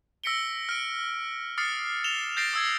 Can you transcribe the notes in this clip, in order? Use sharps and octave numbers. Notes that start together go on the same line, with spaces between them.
E6 A#6 B6 C#7 D7 G7
F6 D7
D6 D#6 F6 A6 C7 C#7
E7 F7 G7
G6 A6 A#6 C7 D7 F7
D#6 E6 G#6